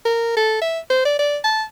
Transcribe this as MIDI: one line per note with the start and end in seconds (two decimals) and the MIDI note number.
0.05 0.33 70
0.37 0.61 69
0.61 0.79 76
0.90 1.01 72
1.05 1.18 74
1.19 1.37 74
1.44 1.63 81